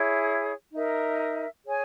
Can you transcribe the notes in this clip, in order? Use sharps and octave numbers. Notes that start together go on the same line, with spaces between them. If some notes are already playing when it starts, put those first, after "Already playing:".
Already playing: E4 G#4 C#5
D#4 A#4 E5
G#4 C#5 G#5